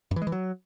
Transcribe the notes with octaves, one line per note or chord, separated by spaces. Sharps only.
F#2
E3
G#3
E3
F#3